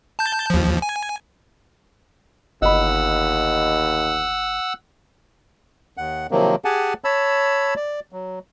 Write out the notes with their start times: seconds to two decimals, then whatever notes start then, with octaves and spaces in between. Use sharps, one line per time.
0.19 A5 G6
0.50 D#2 F3
0.82 G#5
2.62 G1 D#2 D#5 F#5 B5 E6
5.97 D#2 F#5
6.31 C3 D#3 F3 F#3 A#3
6.65 G4 G#4 F#5 G#5 A5
7.04 C#5 A5 B5 E6
7.76 D5
8.12 F#3